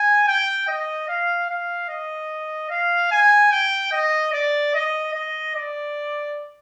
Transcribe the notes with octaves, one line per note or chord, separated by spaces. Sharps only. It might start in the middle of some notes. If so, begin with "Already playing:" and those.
Already playing: G#5
G5
D#5
F5
F5
D#5
F5
G#5
G5
D#5
D5
D#5
D#5
D5